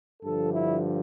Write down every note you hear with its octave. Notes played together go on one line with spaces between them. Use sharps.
G2 D3 F3 A4
E4